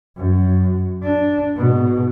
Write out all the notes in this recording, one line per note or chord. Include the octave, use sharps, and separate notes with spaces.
F#2 F#3
D4
G#2 B2